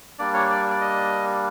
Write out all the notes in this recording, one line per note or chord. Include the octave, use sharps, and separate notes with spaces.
G3 A#3 D4 D5
C#5
D5
D5
D#5